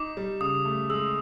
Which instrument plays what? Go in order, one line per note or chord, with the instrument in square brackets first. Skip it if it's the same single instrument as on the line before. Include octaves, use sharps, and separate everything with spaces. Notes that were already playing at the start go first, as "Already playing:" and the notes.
Already playing: [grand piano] D#4 [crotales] D6
[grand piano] G3
[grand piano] C#3 [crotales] D#6
[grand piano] A3
[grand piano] G#3 [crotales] E6